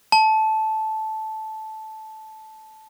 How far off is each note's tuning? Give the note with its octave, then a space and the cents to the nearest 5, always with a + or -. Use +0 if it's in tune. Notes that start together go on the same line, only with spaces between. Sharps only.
A5 -10